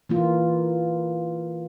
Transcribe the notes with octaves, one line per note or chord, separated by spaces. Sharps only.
E3 A#3 F4